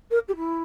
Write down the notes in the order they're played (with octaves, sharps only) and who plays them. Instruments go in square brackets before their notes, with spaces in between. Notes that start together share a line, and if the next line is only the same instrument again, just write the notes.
[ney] A#4
G4
E4